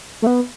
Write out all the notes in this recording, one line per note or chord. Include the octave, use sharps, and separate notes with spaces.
A3
B3